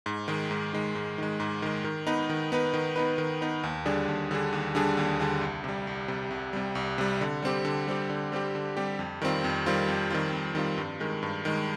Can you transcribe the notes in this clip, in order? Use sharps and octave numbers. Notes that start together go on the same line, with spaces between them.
G#2
D#3 G#3
G#2
D#3 G#3
G#2
D#3 G#3
G#2
D#3 G#3
D#3
B3 D#4 B4
D#3
B3 D#4 B4
D#3
B3 D#4 B4
D#3
B3 D#4 B4
D#2
D3 G3 D4 G#4
D#2
D3 G3 D4 G#4
D#2
D3 G3 D4 G#4
D#2
D3 G3 D4 G#4
C2
C3 G3
C2
C3 G3
C2
C3 G3
C2
C3 G3
D3
G3 C4 G4
D3
G3 C4 G4
D3
G3 C4 G4
D3
G3 C4 G4
F2
D#3 G3 C4 F4
F2
D#3 G3 C4 F4
F2
D#3 G3 C4 F4
F2
D#3 G3 C4 F4
G2
D#3 G#3
G2
D#3 G#3